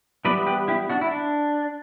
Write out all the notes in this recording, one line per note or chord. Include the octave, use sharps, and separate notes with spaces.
E3 G3 B3 B4 D5
G4 B4
E4 G4
D4 F#4
E4
D4